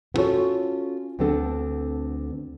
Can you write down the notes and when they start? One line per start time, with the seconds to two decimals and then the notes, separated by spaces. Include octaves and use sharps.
0.14 B3 C#4 F4 F#4 A4 C#5
1.19 D2 B3 C4 D4 A4